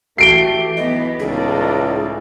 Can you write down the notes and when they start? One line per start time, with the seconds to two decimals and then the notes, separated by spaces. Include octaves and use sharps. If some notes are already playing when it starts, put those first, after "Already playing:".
0.18 E3 A3 F#4 G4 A4 C7 D7 G7
0.77 B1 E3 B3 B4 D#5
1.19 C#2 A2 D#4 G#4 D5